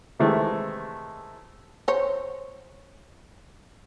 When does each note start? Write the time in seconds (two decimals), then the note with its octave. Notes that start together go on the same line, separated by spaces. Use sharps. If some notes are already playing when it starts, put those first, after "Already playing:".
0.19 C3 D#3 E3 G#3 A3
1.88 C5 C#5